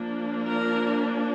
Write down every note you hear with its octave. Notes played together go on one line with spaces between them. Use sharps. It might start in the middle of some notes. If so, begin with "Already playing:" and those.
Already playing: F3 A#3 D4
A#4